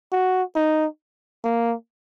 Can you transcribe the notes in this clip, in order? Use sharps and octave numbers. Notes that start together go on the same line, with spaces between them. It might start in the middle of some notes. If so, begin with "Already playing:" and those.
F#4
D#4
A#3